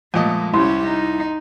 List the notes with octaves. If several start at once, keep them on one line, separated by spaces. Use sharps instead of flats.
F2 A#2 G#3 A3 D#5
C2 C#4 E4 G4 C6
D#4